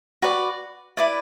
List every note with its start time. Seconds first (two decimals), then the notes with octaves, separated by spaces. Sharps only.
0.22 F#4 B4 D5
0.97 E4 B4 D5 D6